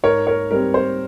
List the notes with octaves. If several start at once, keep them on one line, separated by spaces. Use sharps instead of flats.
G#2 A#4 C#5
A#4 C#5
G3 C4 A#4
C5